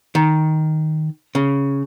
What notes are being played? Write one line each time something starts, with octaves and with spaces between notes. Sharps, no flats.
D#3
C#3